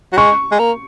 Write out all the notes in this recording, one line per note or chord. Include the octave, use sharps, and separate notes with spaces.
F#3
G#3 C#6
G#3
A#3